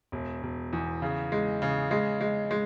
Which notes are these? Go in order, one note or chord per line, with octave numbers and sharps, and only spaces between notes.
E1
E1
E2
C#3
G#3
C#3
G#3
G#3
G#3